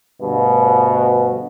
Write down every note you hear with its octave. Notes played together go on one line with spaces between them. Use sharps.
D2 G2 B2